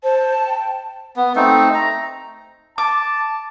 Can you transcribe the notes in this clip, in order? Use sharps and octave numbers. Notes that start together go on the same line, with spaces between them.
C5 A5
G5
B3
A3 C4 D#4
A#5
A5 D6